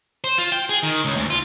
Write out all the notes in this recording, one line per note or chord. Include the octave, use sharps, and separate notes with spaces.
C5
F4
G5
G#4
D#3
C#2
D2
F4